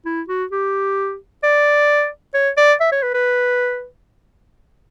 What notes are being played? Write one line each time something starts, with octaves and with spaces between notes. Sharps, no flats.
E4
F#4
G4
D5
C#5
D5
E5
C#5
B4
B4